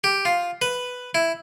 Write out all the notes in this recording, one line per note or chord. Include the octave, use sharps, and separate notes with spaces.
G4
F4
B4
E4